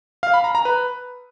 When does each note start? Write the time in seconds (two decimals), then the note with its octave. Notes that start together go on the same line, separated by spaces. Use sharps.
0.23 F5
0.34 B5
0.44 A#5
0.55 A#5
0.65 B4